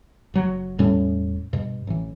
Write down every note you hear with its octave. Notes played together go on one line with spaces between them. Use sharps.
F#1 F#3
E1 A2 G3 C#4
G2 B2
A1 E3